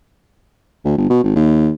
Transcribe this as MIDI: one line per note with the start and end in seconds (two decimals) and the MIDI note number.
0.85 0.96 38
0.98 1.08 31
1.10 1.22 47
1.24 1.35 32
1.36 1.70 39